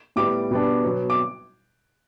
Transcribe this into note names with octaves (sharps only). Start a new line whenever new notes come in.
A2 G3 B3 D6
B2 G3 B3 D4
B2 F#3 B3
D6